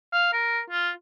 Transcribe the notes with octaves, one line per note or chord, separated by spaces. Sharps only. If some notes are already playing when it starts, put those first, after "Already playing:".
F5
A#4
F4